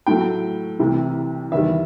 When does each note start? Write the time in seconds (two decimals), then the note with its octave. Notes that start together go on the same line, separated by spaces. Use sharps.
0.07 A2 F#3 A3 G5
0.79 C2 C3 E3 G3
1.52 E2 D#3 G3 E5